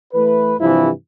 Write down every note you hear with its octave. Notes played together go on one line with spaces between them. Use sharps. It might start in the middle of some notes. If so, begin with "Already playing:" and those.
E3 A3 B4
G2 C3 E3 F3 E4